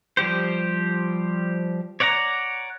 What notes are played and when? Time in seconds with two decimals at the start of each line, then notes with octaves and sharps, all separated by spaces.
0.17 F3 G3 G4 C5
2.00 C#5 D5 F#5 G#5 A#5